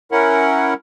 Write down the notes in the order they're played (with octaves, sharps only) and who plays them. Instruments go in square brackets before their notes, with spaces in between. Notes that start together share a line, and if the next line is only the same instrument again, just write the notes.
[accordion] C#4 E4 A#4 F#5